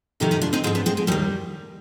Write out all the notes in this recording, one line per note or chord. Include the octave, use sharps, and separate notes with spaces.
F2 C3 D#3 D#4 G4
D#4 G4
D4 F4
C4 D#4
G#2 F3 C4 D#4
B3 D4
G#3 C4
G#3
D#2 D#3 G3